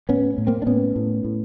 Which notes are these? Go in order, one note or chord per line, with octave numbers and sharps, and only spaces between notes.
A2 B3 C#4
A2
A#3 C4
D4
A2 B3 C#4
A2
A2